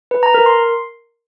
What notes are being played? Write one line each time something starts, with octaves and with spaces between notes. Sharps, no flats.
B4
A#5
A#4
C6